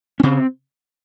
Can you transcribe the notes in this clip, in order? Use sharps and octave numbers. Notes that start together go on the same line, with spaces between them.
C#4
C#3 C4